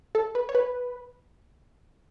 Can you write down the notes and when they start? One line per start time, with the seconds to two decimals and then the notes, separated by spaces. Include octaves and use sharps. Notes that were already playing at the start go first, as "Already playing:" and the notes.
0.15 A4
0.35 B4
0.49 C#5
0.55 B4